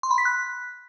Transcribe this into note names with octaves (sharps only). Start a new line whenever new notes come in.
C6
B5
B6
F#6